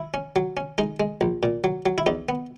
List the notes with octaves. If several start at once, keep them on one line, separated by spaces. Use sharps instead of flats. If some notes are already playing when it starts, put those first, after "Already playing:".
Already playing: E4
C#4
F#3
C#4
G#3 D#4
G#3
A#1
A#2
F#3
F#3
E4
E2 D#4
B3